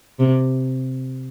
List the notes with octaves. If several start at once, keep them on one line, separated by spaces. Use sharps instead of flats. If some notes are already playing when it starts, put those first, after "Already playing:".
C3